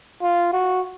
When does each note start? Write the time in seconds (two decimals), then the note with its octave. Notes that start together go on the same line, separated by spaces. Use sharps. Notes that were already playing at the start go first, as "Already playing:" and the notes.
0.23 F4
0.53 F#4